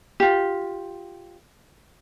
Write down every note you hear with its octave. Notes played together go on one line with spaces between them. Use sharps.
F4 G4